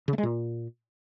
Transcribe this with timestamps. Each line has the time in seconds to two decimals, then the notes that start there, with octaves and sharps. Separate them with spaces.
0.08 C#3
0.13 A3
0.18 G#3
0.23 A#2